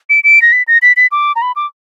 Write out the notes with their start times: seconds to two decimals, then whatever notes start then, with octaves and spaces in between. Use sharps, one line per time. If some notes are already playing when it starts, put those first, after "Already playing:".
0.10 D7
0.24 D7
0.42 A#6
0.52 B6
0.68 A#6
0.82 B6
0.97 B6
1.12 D6
1.36 A#5
1.42 B5
1.56 D6